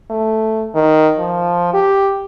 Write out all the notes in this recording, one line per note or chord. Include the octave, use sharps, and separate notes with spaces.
A3
D#3
F3
G4